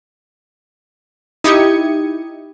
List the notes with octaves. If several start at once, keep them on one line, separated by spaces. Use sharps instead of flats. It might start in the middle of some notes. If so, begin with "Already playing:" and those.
D#4 E4 G4 D#6 G#6 C#7